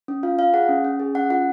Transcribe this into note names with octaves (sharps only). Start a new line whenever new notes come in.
C#4
F4 F5
F4 F5
G#4 F#5
C#4
C#4
G#4
C#4 F#5
F4 F#5